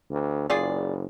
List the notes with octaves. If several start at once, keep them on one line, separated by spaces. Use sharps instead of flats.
D2
F#1 F4 G#4 D5